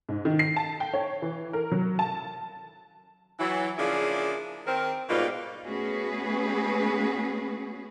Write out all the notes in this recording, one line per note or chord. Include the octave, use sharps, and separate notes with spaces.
G#2
D#3
C7
A5
G5
C#5
E3
A#4
F#3
A5
E3 F#3 E4
C#3 F3 A#3 D4 E4 G#4
D#3 C4 A#4
G#2 B2 G3 A#3 D#4 F4
A3 B3 C#4 F#4 G#4 B4